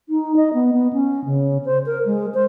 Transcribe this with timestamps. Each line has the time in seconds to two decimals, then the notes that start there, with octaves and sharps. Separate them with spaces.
0.09 D#4
0.36 D#5
0.54 B3
0.73 B3
0.93 C#4
1.25 C#3
1.65 C5
1.86 A#4
2.06 G#3
2.34 C5